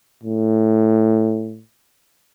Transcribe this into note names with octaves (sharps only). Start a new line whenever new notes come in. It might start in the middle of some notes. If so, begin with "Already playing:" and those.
A2